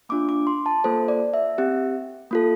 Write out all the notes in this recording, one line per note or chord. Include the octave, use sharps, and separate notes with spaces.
A#3 D4 F4 D6
D6
C6
A5
A#3 F4 A4 C5
D5
E5
C4 G4
A#3 F4 A4